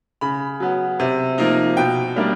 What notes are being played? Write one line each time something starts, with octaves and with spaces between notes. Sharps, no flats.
C#3 B5
F#3 B3
C3
F3 A#3 D#4
B2 G5
G3 A#3 D4